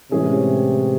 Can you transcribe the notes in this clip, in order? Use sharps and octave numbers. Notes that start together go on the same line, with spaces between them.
A2 C3 E3 G#3 C#4 G#4